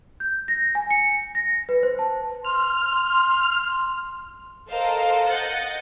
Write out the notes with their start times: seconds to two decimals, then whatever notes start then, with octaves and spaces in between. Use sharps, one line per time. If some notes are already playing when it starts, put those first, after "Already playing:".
0.20 G6
0.48 A#6
0.75 G#5
0.91 C#7
1.35 A#6
1.69 B4
1.83 C5
1.99 A5
2.45 C6 F6
4.70 A4 A#4 C5 D#5 F5
5.28 D#5 F#5 G6 A6 C#7